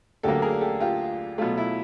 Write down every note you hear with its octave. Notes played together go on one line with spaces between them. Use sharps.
D2 D3 F#3 A#3 G4 A4
G#4 A#4
G4 A4
F4 G4
B2 F#3 A3 F4
E4